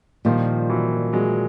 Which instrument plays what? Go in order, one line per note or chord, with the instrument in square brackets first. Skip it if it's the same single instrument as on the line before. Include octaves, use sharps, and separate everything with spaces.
[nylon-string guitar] A#2 G3 A#3 [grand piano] D#3 F3
[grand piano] E3 F#3
F#3 G#3